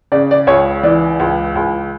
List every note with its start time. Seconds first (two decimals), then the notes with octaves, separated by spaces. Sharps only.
0.12 C#3 D5
0.31 D5
0.47 C#2 C#5
0.83 E3 D5
1.20 C#2
1.55 C#2